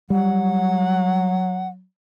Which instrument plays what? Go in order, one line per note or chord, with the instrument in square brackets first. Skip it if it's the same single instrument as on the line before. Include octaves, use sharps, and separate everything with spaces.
[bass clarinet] F#3 [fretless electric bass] G3 [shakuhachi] F#5